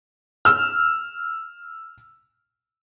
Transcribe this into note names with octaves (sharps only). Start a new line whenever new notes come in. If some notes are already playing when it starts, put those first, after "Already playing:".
E6 F6